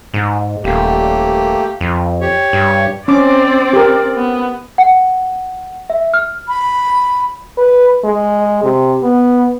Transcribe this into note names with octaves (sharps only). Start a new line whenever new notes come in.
G#2
D#1 A3 A#3 G4
F2
G4 C#5 C#6
G2
C4 C#4 D5 D6
G4 A#4
B3
F#5
E5
F6
B5
B4
G#3
C3
B3